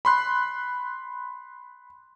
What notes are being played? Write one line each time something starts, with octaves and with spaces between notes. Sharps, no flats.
B5 C6 F#6